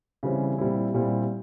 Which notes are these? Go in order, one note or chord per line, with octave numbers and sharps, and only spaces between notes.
C#3 E3 G3 C4
A#2 G3 C4 E4
A#2 G3 C4 E4